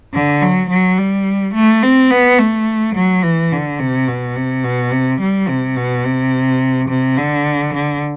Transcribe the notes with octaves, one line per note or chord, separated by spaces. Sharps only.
D3
F#3
F#3
G3
A3
C4
B3
A3
F#3
E3
D3
C3
B2
C3
B2
C3
G3
C3
B2
C3
C3
D3
D3